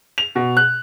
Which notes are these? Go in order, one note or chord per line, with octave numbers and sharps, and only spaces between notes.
F7
B2
F#6